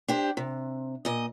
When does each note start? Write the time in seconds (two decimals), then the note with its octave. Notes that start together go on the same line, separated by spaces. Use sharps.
0.08 D4 G4 C5
0.37 C3
1.05 A#2 D#5